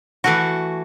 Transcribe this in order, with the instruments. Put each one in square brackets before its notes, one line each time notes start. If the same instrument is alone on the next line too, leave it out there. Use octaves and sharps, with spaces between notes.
[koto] E3 A3 F#4